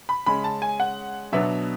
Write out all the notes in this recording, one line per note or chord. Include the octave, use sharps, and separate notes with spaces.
B5
C#3 G#3 C#4 B5
A5
G#5
F#5
B2 F#3 B3 D4 E5